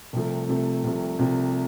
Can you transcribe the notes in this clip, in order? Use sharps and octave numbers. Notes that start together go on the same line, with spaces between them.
C2 C3 F3 A3
C2 C3 F3 A3
C2 C3 F3 A3
C2 C3 F3 A3